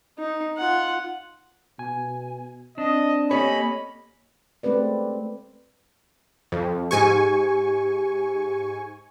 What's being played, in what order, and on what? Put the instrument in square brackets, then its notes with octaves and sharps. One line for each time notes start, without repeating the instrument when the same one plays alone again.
[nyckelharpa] D#4
F4 F#5
[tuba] B2 [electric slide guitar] G#5
[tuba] C4 [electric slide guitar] D4 [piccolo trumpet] D#5
[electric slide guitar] A#3 G4 A4 [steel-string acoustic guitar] C#4 D#5 [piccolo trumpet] B5
[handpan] G#3 A3 C4 G4 B4 D5
[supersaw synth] F2
[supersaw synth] G#2 G#5 C#6 [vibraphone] G4